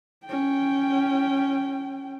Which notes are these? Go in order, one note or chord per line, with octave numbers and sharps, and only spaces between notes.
C#4 G5